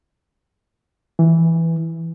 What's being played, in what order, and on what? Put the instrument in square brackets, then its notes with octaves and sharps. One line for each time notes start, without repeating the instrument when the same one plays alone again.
[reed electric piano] E3